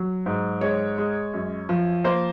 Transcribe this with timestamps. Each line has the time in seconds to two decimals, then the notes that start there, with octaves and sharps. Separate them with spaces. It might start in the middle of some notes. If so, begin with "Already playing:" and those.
Already playing: F#3
0.26 G#2
0.61 G#3 C#5
0.98 G#3
1.34 F#2
1.69 F3
2.04 A#3 C5